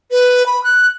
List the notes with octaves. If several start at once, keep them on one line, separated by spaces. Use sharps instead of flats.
B4
B5
F#6